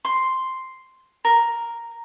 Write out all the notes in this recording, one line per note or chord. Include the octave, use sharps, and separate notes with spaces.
C6
A#4